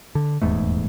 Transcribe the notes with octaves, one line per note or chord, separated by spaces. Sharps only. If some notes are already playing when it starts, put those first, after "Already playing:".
D3
D#1 E2 G#2 A3